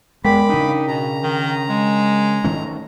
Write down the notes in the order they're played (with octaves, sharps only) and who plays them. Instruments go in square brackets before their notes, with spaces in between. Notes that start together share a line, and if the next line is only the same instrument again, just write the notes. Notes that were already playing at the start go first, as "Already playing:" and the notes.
[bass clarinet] E2 [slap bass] G#3 [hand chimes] A#4 G5 B6 [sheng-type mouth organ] B5 D6
[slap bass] C#3 D4 [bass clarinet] D#4
[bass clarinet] B2 [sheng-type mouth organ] A#5
[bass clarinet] D#3
G#3
[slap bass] D#3 A3 C#4